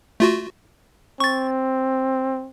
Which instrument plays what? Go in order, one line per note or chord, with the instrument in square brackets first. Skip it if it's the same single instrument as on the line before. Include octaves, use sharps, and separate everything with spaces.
[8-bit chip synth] A3 F4 F#4
[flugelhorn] C4 [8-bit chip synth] C#6 A6